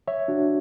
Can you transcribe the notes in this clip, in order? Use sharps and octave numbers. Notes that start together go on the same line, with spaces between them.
C#5 E5
D4 F#4